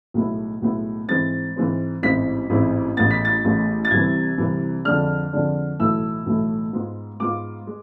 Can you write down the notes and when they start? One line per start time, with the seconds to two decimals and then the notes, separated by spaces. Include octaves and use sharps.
0.14 B1 A2 G#3 B3 E4
0.62 B1 A2 G#3 B3 E4
1.08 G#2 E3 G#3 C4 A6
1.56 G#2 E3 G#3 C4
2.03 A1 G#2 G#3 C4 E4 B6
2.50 A1 G#2 G#3 C4 E4
2.97 A1 A2 G#3 B3 A6
3.11 B6
3.25 A6
3.45 A1 A2 G#3 B3
3.85 A6
3.91 C2 C3 E3 G#6
4.38 C2 C3 E3
4.85 F2 D3 G#3 D4 F6
5.33 F2 D3 G#3 D4
5.79 B1 A2 E3 A3 E4 E6
6.26 B1 A2 E3 A3 E4
6.73 G#2 G#3 B3 F4
7.20 G#2 G#3 B3 F4 D6
7.67 G#3